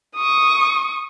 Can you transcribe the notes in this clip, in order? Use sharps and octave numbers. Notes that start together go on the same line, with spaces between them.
C#6 D#6